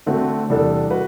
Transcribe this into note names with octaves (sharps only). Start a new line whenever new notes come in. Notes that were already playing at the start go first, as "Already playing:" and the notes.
D3 A3 C4 F#4
E2 C3 G3 D4 A4
F#4 B4